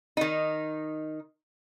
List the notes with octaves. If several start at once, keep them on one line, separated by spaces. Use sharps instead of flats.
D#3 D#4